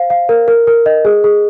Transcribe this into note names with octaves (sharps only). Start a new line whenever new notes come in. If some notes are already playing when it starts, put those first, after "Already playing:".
Already playing: C5 F5
F5
A#4
A#4
A#4
D#5
G#4
G#4